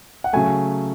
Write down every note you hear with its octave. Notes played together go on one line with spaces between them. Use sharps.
F#5
C#3 F#3 A3 G#5